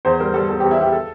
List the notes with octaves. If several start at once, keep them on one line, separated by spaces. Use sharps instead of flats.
E2 C5
G3 A#4
G3 A4
E2 A4
G4
E2
E4
E2 G4
A4